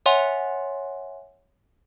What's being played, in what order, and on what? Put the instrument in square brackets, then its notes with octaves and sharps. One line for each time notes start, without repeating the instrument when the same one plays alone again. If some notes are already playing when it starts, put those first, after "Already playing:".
[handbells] C#5 E5 F#5 G#5 C6